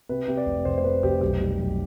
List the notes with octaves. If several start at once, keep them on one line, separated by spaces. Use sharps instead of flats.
C3 B4
C3
D5
F1
F1 C5
C5
C3 B4
F1 G4
B1 G4
G3
B1